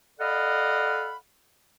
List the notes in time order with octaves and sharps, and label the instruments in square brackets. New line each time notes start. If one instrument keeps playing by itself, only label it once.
[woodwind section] A4 D5 D#5 F5 F#5 B5